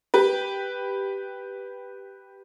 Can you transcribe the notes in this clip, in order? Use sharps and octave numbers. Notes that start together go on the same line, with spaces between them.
G4 B4